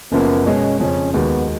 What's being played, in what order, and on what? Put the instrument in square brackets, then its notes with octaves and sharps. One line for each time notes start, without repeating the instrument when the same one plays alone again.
[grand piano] F#1 F#2 F3 A#3 [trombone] B3
[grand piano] B2 G#3 B3 [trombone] C#4
[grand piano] F2 C#3 F3 [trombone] C#4
[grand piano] D#2 D#3 G#3 D#4 F#4 [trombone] B3